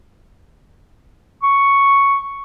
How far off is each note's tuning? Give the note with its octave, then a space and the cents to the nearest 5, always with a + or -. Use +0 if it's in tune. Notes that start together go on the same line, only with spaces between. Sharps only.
C#6 +0